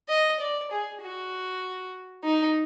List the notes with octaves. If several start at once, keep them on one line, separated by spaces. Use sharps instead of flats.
D#5
D5
G#4
F#4
D#4